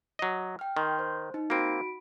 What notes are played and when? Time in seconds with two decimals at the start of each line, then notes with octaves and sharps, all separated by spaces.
0.19 F#3 D#5
0.59 G5 F6
0.77 D#3 C6 G6
0.99 C5
1.34 D#4
1.50 A#3 C4 F#4 B5 D7